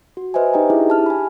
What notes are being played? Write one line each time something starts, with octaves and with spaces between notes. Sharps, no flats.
F#4
B4 C5 D#5 E5 G#5
D#4 G4 D#5 G5 A#5
D4 E4 G#4 E5
G4 A5 F6
G#5 B5